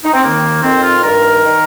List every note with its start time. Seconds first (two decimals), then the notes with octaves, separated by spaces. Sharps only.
0.04 D#4
0.13 C4
0.23 D#2 D#3 A#3
0.63 F2 D#3 C4
0.83 F4
1.04 G2 D#3 A#4
1.44 D#3